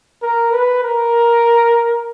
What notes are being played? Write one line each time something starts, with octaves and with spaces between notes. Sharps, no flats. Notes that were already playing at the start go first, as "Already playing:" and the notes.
A#4
B4
A#4